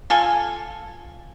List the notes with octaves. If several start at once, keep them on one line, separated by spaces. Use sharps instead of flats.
F4 A4 G#5